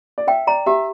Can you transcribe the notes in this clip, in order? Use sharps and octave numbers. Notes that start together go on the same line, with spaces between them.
D5
E5 G5
D5 A#5
G4 E5